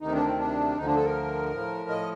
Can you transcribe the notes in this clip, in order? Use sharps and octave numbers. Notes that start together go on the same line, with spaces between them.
D2 C3 D#3 D#4
D4
C4
D4
D2 D3 F3 D#4
D4
A4
A#4
A2 F3
D#5